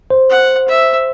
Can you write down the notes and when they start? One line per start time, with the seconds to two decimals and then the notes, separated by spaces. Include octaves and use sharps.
0.10 C5
0.30 F#5
0.68 E5